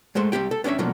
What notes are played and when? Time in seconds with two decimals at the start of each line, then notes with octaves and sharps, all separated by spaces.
0.15 G#3 A3 C5 C6
0.32 C2 A#2 C4 G4 G5
0.51 A4
0.64 B3 C#4 D4 C#5 E5
0.79 B2 F3 F#3 A3 A#3 D4